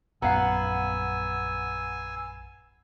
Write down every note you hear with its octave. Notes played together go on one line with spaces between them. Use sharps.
A#1 F#2 B3 F5 F#5 G#5 A#5 E6